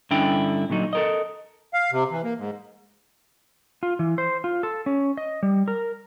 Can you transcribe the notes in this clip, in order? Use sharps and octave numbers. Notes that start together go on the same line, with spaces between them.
G2 D3 C#4 D4 E4 G5
A#2 D3 F#3 D#4
A4 A#4 D#5
F5
C3
E3
A#3
G#2
F4
E3
C5
F4
A4
C#4
D#5
G3
A#4